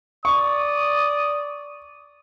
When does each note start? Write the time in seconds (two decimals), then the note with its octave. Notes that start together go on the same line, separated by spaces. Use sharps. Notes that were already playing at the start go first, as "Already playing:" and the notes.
0.25 D5 C#6 D#6